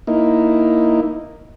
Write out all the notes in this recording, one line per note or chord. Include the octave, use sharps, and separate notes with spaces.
A#3 D#4 E4